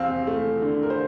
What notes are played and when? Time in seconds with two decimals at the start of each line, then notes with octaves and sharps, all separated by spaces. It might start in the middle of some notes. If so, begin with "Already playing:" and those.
Already playing: E2 C4 F5
0.27 A3
0.62 D3
0.83 A#4
0.90 C5